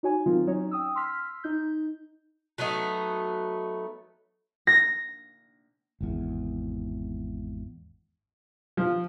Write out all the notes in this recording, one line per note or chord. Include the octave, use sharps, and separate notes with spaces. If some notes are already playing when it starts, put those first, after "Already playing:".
D#4 F#4 C#5 G#5
D#3 F#3 C4 D#4 F4
F#3 C#4 D#4 C#5
G5 D#6 E6
C6 E6 F6 B6
D#4 G6
F#3 A3 B3 D#4
A#6
G#1 E2
F3